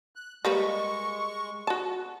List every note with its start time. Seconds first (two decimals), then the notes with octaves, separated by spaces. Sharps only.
0.16 F#6
0.45 G3 G#3 A#3 B4 C#6
1.67 F#4 A5